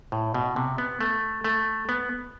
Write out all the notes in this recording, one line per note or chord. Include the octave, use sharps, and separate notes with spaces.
A2
B2
C3
B3
A3
A3
B3